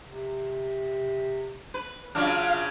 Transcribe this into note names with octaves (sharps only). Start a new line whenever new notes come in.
C3
B4
C#3 F#3 D4 F4 F5